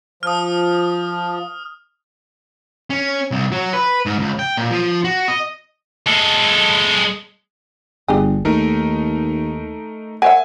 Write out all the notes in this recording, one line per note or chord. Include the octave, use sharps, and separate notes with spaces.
F3 D#6 F6
C#4
C2
F#3
B4
G#2
C#2
G5
A#2
F3
F#4
D#5
G#3 A4
G1 D4 G4 G#4
D#2 A3 D#4 A#4
A#4 C#5 E5 F#5 G#5